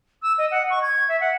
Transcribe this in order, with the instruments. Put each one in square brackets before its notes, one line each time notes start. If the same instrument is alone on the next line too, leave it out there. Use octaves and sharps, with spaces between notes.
[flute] E6
D#5
F#5
C#6
G#6
E5
F#5